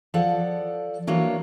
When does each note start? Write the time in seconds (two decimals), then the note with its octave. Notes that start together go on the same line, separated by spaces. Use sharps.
0.14 F3 A4 D5 F#5
1.07 E3 F#3 A#3 D4 A#4 C#5